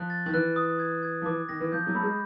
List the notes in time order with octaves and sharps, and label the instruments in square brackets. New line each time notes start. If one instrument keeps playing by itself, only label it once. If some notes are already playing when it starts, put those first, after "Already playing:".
Already playing: [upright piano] F3 [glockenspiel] F#6
[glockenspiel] A6
[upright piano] D#3
[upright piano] E3 [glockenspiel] F#6
[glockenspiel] D#6
G#6
G#6
[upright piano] F3
[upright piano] E3 [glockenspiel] D6
[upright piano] D#3 [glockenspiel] A#6
[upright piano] E3
[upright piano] F3 [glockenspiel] G6
[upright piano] F#3
[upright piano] A3 [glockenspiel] B5
[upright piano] G#3